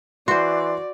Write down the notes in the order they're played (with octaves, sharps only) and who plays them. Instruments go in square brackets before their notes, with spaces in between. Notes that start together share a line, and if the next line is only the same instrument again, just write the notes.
[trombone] E3 [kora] F#4 C5 [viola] D5 [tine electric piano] C6